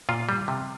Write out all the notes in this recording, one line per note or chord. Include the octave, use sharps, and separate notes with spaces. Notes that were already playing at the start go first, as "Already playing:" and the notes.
A#2 F4
G3
C3